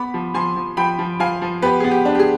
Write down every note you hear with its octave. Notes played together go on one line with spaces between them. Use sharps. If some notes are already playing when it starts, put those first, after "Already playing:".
Already playing: B3 B5 D6
F3
F3 G#5 C6
F3
F3 G5 B5
F3
F3 F5 G#5
F3
B3 G4 B4
B3 G#4
G4
D4
G4
G#4